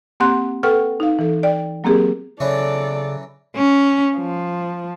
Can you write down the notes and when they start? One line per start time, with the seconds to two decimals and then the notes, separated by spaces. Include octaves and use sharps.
0.20 A#3 C4 G4 F#5 C6 F#6
0.63 A4 B4 F#5 G5 C#6 F6
1.00 D#4 F5
1.19 E3 A4
1.43 D5 G5
1.84 F#3 A#3 C4 G4 G#4 A#4
2.40 C#3 E3 F#3 C#4 A4 D5
3.56 C#4
4.17 F3